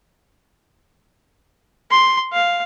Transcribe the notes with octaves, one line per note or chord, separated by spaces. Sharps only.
C6
F5